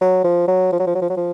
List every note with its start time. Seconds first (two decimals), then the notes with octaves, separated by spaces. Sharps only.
0.01 F#3
0.24 F3
0.48 F#3
0.72 F3
0.79 F#3
0.87 F3
0.95 F#3
1.02 F3
1.10 F#3
1.17 F3